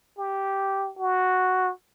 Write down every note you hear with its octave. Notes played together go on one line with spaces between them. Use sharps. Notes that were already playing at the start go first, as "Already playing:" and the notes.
G4
F#4